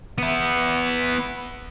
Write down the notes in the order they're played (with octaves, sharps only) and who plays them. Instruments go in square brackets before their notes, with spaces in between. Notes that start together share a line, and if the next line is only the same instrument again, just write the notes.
[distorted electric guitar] B3 E4